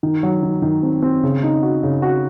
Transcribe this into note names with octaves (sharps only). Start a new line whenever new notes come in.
D#3
F#3
D#3
D#3
C4
C4
C#3
D#4
F#4
C#3
F#4